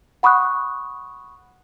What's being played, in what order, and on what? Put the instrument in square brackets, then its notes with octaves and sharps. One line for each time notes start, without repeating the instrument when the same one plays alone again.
[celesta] F#5 B5 C#6 D#6 F#6